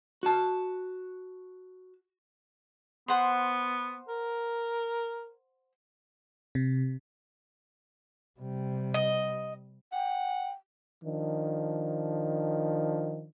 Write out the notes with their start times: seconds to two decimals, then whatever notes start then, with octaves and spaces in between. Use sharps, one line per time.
0.23 F#4 A5
3.08 B3 C5 F#5 C6
4.09 A#4
6.55 C3
8.40 C3 G3
8.94 D#5
9.93 F#5 G5
11.04 D#3 F3 D4